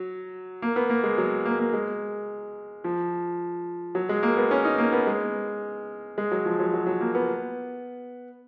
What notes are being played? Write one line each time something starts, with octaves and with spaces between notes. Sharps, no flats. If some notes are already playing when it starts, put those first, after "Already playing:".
Already playing: F#3
A#3
B3
A#3
G#3
F#3
A#3
A#3
G#3
F3
F#3
G#3
A#3
B3
C#4
D#4
A#3
B3
G#3
G#3
F#3
F3
F#3
F#3
F#3
A#3
B3